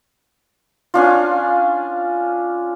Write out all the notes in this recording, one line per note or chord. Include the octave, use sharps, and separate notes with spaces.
C#4 D4 F4